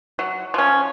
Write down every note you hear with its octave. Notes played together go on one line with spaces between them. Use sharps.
F#3
F3 C#4